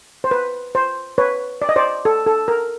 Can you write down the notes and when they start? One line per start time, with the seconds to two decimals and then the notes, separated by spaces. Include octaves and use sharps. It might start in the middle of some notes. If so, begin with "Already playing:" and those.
0.24 C5
0.31 B4
0.75 C5
1.18 B4 C#5
1.62 D5
1.69 D#5
1.76 C5 D5
2.05 A4
2.27 A4
2.48 A#4